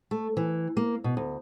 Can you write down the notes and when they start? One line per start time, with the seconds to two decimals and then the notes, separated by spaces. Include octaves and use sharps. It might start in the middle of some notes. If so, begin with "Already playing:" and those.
0.11 A3
0.37 E3
0.77 A#3
1.04 B2
1.17 D2